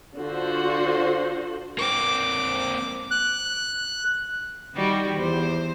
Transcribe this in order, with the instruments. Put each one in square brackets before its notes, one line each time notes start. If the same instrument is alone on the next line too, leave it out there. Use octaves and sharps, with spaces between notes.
[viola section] D3 F4 F#4 C5
[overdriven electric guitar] A#3 C4 [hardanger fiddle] D6
[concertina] F#6
[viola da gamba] D#3 G3 F#4
E2 C5